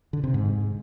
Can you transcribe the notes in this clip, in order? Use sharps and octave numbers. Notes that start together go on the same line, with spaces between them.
D3
C3
G#2